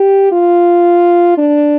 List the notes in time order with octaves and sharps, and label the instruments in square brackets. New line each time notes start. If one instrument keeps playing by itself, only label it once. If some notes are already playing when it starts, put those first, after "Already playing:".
Already playing: [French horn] G4
F4
D4